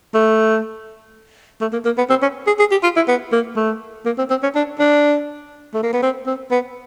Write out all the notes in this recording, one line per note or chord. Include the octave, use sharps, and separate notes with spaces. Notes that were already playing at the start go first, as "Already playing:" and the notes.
A3
A3
A#3
A#3
B3
C4
C#4
G#4
G#4
G4
F4
E4
B3
A#3
A3
A#3
C4
C4
C#4
D4
D4
A3
A#3
B3
C4
C4
B3